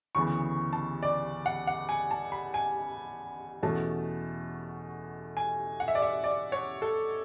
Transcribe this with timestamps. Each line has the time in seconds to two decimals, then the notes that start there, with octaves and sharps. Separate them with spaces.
0.15 D2 C#3 E3 B3 C#6
0.73 A5
1.03 D5
1.46 F#5
1.67 F#5
1.89 G#5
2.11 A5
2.32 B5
2.54 G#5
3.63 E2 B2 A3 C#4 A5
5.37 G#5
5.80 F#5
5.88 E5
5.95 D5
6.02 E5
6.24 D5
6.52 C#5
6.82 A4